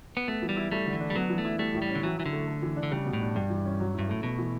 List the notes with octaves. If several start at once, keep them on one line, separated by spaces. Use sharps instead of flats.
B3
A3 B3
E3
G3
E4
G3 A3
D3
E3
D4
G3
F#3 B3
E3
A3
E4
G3 A3
A2
G3
C#4
D3
E3 F#3
E3 E4
D3
A3
A3
E3
D4
D3
C#3 G3
B2
A2
D4
G2 G3
E3
C#4
F#3
G2 E4
A2 A3
B2 A3
E3